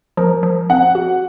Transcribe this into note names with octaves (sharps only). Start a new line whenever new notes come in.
F3 A#4
F3
C4 F#5
F#4